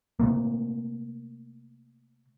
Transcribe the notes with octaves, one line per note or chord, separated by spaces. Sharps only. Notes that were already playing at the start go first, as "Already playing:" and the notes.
C3 A3 A#3